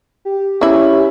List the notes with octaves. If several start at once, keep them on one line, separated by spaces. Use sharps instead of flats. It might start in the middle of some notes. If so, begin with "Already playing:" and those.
G4
E3 C#4 E4